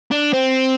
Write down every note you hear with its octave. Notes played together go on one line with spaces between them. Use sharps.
D4
C4